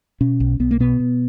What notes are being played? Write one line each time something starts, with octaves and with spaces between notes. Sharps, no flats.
B2 C#4
B1
B1 B3
A#3
B2 B3
B2